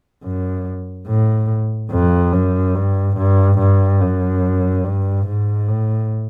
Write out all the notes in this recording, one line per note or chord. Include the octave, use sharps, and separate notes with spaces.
F#2
A2
F2
F#2
G2
G2
G2
F#2
G2
G#2
A2